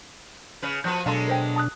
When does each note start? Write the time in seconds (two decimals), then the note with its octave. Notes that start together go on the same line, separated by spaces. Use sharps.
0.62 C#3 B4
0.84 F3 F#4 B4 G6
1.06 B2 F#3 G#3 D4 A4 F5 A5 C6
1.28 A#4 C5 G5
1.56 A5 D#6 F#6